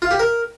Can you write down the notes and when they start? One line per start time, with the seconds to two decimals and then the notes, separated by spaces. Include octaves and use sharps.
0.02 F4
0.11 G4
0.19 A#4